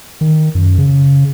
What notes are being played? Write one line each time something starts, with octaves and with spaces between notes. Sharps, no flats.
D#3
F#2
C#3